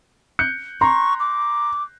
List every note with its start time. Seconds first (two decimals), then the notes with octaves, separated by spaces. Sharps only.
0.39 F#6 G6 C#7
0.81 A#5 C6 C#6
1.20 D6